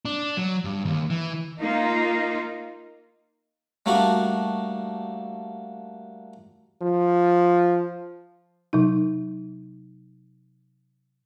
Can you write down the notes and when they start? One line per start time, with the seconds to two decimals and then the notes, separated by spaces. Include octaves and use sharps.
0.05 D4
0.37 F#3
0.65 G2
0.85 D#2
1.10 E3
1.60 A#3 D#4 F4
3.86 G3 A3 A#3 D4 F#4 C#6
6.82 F3
8.73 C3 F#3 D#4